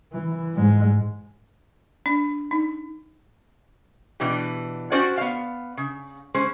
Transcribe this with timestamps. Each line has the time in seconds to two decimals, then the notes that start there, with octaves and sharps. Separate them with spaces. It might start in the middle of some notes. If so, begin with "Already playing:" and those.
0.12 E3
0.54 G#2 G#3
2.06 D4
2.51 D#4
4.20 B2 E3 D4 G4
4.92 C#4 F#4 G4 C5 D5
5.17 B3 F5
5.77 C#3
6.34 G#3 C#4 C5